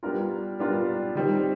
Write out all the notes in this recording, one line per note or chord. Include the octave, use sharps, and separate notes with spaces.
G3 B3 D4 F4 A#4
G3 B3 D4 F4 A#4
D#3 G3 C4